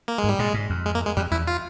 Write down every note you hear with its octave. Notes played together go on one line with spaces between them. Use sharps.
A#3
G#3
G#2
G3
A#2 G#3
G#2
F2
G#3
A#3
G#3
F2 G3
E2 E4
F4